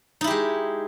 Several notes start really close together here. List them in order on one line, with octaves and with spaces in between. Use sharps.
D#4 E4 G4 G#3